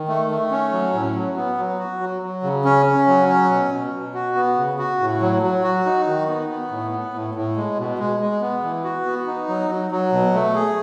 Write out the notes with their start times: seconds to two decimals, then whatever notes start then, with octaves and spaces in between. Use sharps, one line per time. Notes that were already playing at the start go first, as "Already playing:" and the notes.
Already playing: D#3
0.08 A3
0.30 A3
0.51 C#4
0.72 F#3
0.94 A2
1.15 F#3
1.36 B3
1.58 F#3
1.79 F#4
2.01 F#3
2.22 F#3
2.43 C#3
2.65 C#4
2.86 C#4
3.07 F#3
3.28 C#4
3.50 B2
3.71 B2
3.93 B2
4.14 F#4
4.35 B3
4.57 C#3
4.78 F#4
5.00 A2
5.21 F#3
5.43 F#3
5.64 F#4
5.86 D#4
6.07 D#3
6.28 B3
6.50 B3
6.71 A2
6.91 B3
7.14 A2
7.34 A2
7.56 G#3
7.78 B2
7.99 G#3
8.20 G#3
8.41 B3
8.63 E3
8.84 F#4
9.05 B3
9.27 D#4
9.48 F#3
9.70 F#3
9.91 F#3
10.12 B2
10.34 A3
10.55 G#4